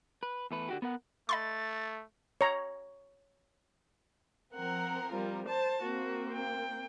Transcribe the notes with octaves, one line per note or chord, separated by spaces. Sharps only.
B4
E2 A3 B4
D3 F#4 G4
B3 A#4 F#5
A3 D#5 B5 C6 A6
C#5 A#5
F3 C4 A#4 F#5
G3 F4
C5 A5
A#3 C4 F#4
G5